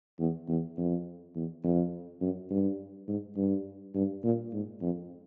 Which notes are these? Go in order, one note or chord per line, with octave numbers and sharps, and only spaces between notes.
E2
E2
F2
E2
F2
F#2
G2
G#2
G2
G2
A#2
G#2
F2